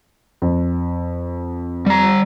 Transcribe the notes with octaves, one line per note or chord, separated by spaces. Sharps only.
F2
G3 A#5